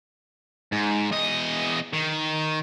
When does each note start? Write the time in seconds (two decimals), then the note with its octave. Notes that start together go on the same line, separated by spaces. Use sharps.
0.72 G#2
1.11 E2 D#5
1.93 D#3